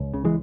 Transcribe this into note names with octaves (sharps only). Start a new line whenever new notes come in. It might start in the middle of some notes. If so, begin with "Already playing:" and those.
Already playing: C#2
C#3
E3 G#3